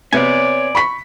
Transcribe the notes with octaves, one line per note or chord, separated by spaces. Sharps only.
C3 B3 C#5 D5 G#5
B5 C#6 B6